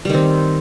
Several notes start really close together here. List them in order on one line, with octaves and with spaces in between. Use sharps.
G3 D#3 C4